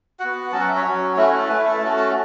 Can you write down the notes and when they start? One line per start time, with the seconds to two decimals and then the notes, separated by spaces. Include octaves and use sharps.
0.20 B3 F#4 F#5
0.52 F#3 C#4 F#4 A5
0.61 F#5
0.68 E5
0.76 C#5
0.85 F#3 C#4 F#4
1.16 A3 C#4 E4 F#4
1.27 F#4
1.38 A4
1.48 A3 E4 B4
1.65 A4
1.80 A3 C#4 F#4 A5
1.97 A5